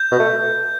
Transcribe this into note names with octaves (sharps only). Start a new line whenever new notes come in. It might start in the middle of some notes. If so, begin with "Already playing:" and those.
Already playing: G6
B2
A3